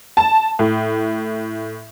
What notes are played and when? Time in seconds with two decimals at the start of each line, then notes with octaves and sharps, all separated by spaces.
0.17 A5
0.59 A2